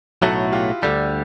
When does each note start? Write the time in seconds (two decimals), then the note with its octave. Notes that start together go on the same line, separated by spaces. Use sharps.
0.22 B1 A2 F#3 A3 E4 F#4
0.52 F4 G4
0.82 D2 D3 G3 G4 A4